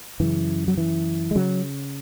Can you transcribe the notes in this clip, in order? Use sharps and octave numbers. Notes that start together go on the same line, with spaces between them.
F#2 C#3 E3
F#3
E3
G#3
C#3 F#3